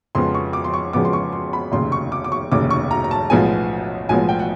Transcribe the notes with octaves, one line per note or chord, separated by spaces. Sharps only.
F2 C#3 F3 G#3 B3 C6
C#6
D6
C6
C#6
F2 C#3 F3 G#3 B3 D6
C6
C#6
C6
B5
F1 D#2 C#3 C6
C#6
D6
D6
C#6
F1 D#2 C#3 D6
C#6
A#5
A#5
A5
B1 A2 F3 G#3 B3 G#5
B1 A2 F3 G#3 B3 G#5
G5
F#5